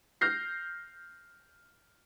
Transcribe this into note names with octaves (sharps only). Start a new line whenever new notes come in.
F6 G6 A#6 C7